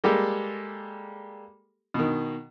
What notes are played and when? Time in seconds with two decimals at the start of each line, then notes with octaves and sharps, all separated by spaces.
0.04 G3 G#3 A#3 G4 A4
1.94 B2 D#3